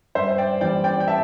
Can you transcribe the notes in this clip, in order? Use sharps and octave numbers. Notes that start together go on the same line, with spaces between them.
G2 C5 E5
D5 G5
E3 G3 D5 G5
D5 G5
G5
E5 A5